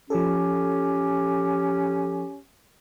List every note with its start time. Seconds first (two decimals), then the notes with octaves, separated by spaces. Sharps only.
0.10 F3 C#4 G4 A4